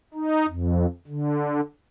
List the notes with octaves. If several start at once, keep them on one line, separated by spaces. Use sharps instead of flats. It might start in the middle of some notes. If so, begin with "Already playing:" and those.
D#4
F2
D3